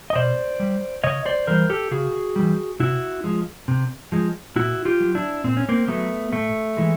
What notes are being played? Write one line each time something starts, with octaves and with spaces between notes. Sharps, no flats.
D#5
B2 C5 D5
G3
C#3 C#5 D#5
C5 D5
E3 G3 A#4 C5
G4 A4
C#3 F#4 G#4
E3 G3
C3 E4 F#4
F3 G#3
C3
F3 G#3
A#2 E4 F#4
F4 G4
F#3
D4 E4
A#2 C4
C#4
A#3 C4
F#3 A3 B3
A2 A3
E3 G#3